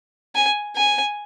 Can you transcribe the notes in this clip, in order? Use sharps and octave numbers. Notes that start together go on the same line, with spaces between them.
G#5
G#5